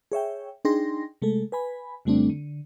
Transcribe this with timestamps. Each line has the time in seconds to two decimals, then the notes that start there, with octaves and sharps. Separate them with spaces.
0.12 G#4 C#5 E5 G5
0.65 D4 D#4 G#4 G5 C6 A#6
1.22 C3 G#3 A3 A4
1.52 B4 G#5 B5
2.05 F2 C#3 G3 A3 C4 D4
2.30 D3